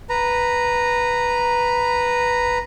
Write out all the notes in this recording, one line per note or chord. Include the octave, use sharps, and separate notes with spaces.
B4 A#5